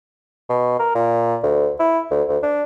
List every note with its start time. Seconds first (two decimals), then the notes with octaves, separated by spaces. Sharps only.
0.50 B2
0.79 A#4
0.95 A#2
1.43 D2
1.79 E4
2.11 D2
2.29 D2
2.43 D4